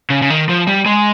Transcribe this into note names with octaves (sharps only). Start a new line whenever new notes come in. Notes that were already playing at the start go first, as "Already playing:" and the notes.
C#3
C#3
D#3
F3
G3
G#3